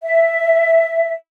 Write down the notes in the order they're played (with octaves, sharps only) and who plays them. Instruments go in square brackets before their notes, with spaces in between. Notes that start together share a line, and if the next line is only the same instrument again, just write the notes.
[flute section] E5